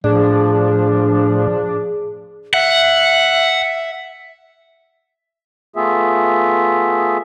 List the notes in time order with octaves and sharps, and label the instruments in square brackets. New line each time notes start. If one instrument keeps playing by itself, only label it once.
[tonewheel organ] A2 [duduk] F3 [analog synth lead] D4 [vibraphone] G#4
[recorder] E5 [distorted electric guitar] F#5
[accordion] A3 B3 F4 G#4 E5